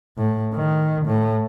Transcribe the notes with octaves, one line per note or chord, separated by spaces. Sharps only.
A2
D#3
A2